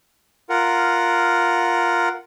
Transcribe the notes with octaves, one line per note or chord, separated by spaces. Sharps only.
F4 A#4 F#5